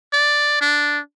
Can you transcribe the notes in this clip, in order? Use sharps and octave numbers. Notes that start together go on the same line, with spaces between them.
D5
D4